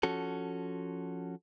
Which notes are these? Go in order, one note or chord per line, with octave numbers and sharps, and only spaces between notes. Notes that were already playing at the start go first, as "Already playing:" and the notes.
F3 C#4 F#4 A4